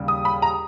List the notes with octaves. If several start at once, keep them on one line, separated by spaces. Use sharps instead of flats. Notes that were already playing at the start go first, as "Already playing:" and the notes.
Already playing: D#2 C#3 G3
D#6
B5
A#5